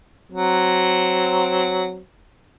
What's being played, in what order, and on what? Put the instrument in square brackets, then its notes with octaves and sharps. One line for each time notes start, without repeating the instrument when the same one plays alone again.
[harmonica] F#3 C4